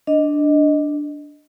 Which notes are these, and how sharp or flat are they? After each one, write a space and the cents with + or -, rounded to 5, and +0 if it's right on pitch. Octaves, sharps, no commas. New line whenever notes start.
D4 +0 D#5 +0